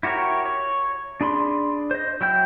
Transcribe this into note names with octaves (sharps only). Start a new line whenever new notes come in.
E4 F#4 G4 A#4 C#5
C#5
D4 G#4 B5 C6
C5 D#5
F#3 E4 G5 G6